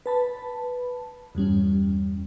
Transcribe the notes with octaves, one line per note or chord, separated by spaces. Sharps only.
B4 A5 B5
E2 G2 G3 C#4